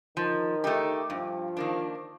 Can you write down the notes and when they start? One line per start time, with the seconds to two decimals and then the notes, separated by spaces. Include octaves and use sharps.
0.17 D#3 F3
0.64 A3 D#4 G4
1.10 G2 F3
1.57 D#3 A#3 D4